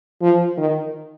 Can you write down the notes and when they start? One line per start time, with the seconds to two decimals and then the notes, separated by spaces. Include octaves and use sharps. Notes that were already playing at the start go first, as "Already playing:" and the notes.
0.22 F3
0.58 D#3